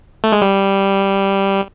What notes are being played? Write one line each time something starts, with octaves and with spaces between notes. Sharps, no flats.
A3
G#3
G3